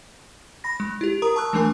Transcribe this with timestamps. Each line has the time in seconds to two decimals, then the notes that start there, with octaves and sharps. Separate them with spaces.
0.64 B5 A#6
0.80 G#3
1.01 E4 G4
1.22 A#4 A#5 D#6
1.36 A5 C#6 E6 F#6
1.53 E3 G#3 A3 D4 A#4 G#5